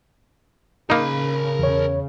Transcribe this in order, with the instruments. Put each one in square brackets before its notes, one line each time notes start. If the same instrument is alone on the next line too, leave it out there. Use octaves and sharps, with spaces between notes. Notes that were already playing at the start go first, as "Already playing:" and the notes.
[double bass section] C#3 [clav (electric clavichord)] A#3 D#4 [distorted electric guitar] A#4 B5
[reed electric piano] E2 C#5